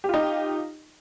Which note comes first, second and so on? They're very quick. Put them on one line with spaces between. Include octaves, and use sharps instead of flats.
G4 F4 D#4